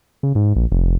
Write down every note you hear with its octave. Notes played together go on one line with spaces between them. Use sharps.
C#3
G#2
A#1
F1